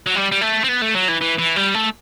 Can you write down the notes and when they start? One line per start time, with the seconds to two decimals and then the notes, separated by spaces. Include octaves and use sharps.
0.07 F#3
0.16 G3
0.32 G3
0.41 A3
0.64 C4
0.69 B3
0.82 A3
0.95 F#3
1.09 E3
1.21 E3
1.38 E3
1.56 G3
1.74 A3